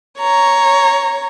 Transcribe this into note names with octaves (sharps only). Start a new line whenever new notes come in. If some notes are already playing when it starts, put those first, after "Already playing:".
C#5 A#5